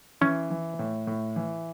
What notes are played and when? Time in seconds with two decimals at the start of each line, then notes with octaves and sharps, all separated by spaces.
0.21 E3 C#4
0.50 E3
0.79 A2
1.07 A2
1.36 E3